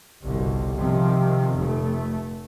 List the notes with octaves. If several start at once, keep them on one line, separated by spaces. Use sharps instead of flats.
G1 C2 B2
C3 D#3 F3
F1 A3